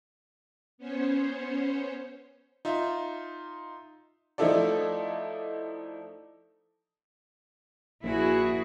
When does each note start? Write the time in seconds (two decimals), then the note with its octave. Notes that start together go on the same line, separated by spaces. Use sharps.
0.78 B3 C#4 C5 C#5
2.65 D#4 F4 E5
4.38 F3 A3 D#4 E4 A4 D5
8.04 A#1 E4 F#4 G#4